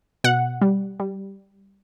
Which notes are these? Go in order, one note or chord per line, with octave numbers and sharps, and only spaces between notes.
B2 F#5
G3
G3